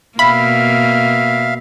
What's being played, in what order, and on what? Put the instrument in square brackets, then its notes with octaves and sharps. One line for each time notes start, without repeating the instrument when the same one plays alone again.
[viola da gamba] B2 A#3 [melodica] E5 F5 [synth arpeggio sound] B5